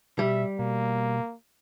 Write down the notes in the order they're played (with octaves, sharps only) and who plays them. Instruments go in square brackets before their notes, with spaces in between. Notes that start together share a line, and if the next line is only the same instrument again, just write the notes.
[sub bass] B2 [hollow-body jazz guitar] G3 [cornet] E5
[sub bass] B2 [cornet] A#3